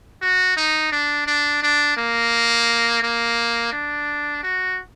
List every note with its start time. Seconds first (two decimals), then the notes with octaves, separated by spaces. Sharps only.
0.22 F#4
0.57 D#4
0.92 D4
1.27 D4
1.62 D4
1.97 A#3
3.02 A#3
3.72 D4
4.43 F#4